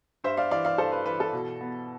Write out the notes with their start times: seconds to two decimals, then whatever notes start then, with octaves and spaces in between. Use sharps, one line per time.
0.24 G2 C5 E5
0.37 D5 F5
0.51 E3 D5 F5
0.65 D5 F5
0.78 G2 A4 C5
0.92 B4
1.05 E3 B4
1.20 A4
1.33 B2
1.61 B3